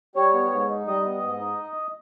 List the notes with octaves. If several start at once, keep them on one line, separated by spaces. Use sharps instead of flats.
G3 C#5
B3
G#2
D#4
G3 D#5
B3
G#2
D#4